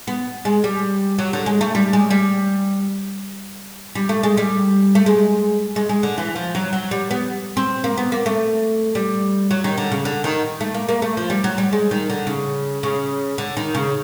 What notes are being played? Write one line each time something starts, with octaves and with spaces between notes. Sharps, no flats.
B3
G#3
G3
F#3
D3
G#3
A3
G3
G#3
G3
G3
A3
G#3
G3
A3
G#3
G#3
G#3
D3
E3
F3
F#3
F#3
G3
B3
C4
A#3
B3
A#3
A3
G3
F#3
D#3
D3
C#3
D3
D#3
A3
A#3
A#3
A3
F3
G3
F#3
G3
G#3
D#3
D3
C#3
C#3
D3
D#3
C#3